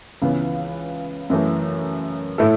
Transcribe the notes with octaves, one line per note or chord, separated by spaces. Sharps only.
C#2 C#3 E3 B3
F#2 E3 A3
A2 A3 E4 A4